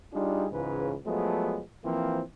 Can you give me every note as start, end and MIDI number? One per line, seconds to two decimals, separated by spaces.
0.14 0.47 55
0.14 0.47 62
0.14 0.47 63
0.14 0.47 65
0.14 0.47 68
0.52 0.95 37
0.52 0.95 44
0.52 0.95 49
0.52 0.95 52
0.52 0.95 71
1.06 1.61 53
1.06 1.61 54
1.06 1.61 56
1.06 1.61 57
1.06 1.61 59
1.85 2.22 52
1.85 2.22 53
1.85 2.22 58
1.85 2.22 60